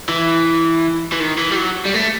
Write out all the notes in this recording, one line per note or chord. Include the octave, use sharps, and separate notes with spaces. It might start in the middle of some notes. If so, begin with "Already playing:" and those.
E3
E3
D#3
E3
G3
F#3
G3
A3